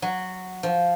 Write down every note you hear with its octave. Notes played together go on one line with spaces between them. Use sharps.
F#3
F3